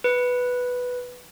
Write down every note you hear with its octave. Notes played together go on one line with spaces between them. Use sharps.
B4